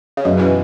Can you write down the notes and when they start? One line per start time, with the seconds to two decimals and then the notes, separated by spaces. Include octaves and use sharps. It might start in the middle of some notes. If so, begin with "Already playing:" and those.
0.17 C#3
0.25 F#2 B2
0.39 E3